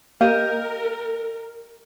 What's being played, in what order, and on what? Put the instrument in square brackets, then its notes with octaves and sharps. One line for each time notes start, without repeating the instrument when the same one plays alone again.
[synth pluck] A#3 [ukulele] G4 D#5 [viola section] A#4